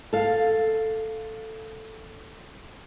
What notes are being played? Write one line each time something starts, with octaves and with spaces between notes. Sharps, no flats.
A4 F5